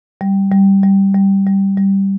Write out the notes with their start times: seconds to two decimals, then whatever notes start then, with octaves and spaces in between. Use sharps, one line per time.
0.21 G3
0.52 G3
0.83 G3
1.14 G3
1.47 G3
1.78 G3